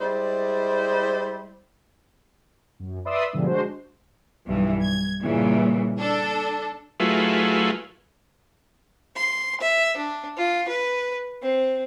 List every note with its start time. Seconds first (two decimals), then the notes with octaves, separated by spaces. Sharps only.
0.01 G3 G#3 E4 C5 D5
2.80 F#2
3.05 B4 D5 E5 C6 D#6 E6
3.33 G2 B2 D3 F3 G3 G#3
3.46 G#3 D4 F#4 C5
4.46 B1 G2 E3
4.83 G#6
5.23 G2 A#2 C#3 E3
6.00 D4 A4
7.00 F#3 A3 E4 F4 G#4 B4
9.16 C6
9.61 E5
9.97 D4
10.37 F4
10.68 B4
11.43 C4